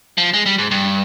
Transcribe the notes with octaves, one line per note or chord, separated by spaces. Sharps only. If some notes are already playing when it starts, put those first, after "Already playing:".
F3
G#3
G3
G#2
G2